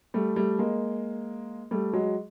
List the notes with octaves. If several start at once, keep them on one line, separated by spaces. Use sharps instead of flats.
G3 A3
G3 A3
G#3 A#3
G3 A3
F#3 G#3